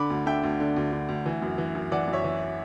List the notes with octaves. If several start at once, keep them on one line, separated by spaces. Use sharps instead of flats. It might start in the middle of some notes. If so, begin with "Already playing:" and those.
Already playing: D3 B5 D6
D2
D3 E5 G5
D2
D3
D2
D3
D2
E3
F#2
E3
F#2
E3 D5 F#5
F#2
C#5 E5
E3